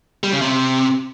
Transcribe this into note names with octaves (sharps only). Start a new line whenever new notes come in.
G3
C#3
C3